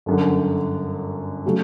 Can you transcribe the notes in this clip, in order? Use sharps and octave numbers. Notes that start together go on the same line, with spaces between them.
G1 F#2 D3
C#3 F#3 A3